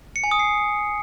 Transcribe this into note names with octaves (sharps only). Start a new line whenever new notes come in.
C#7
G#5
D#6
C7